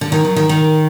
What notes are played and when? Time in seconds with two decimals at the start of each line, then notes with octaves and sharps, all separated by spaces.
0.01 D3
0.12 D#3
0.25 F#3
0.36 D#3
0.49 D#3